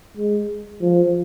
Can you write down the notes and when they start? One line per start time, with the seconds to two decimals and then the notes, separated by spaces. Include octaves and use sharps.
0.17 G#3
0.82 F3